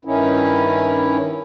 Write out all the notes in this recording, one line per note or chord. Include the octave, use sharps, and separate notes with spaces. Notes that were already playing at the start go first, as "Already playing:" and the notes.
G2 D#3 C#4 D#4 E4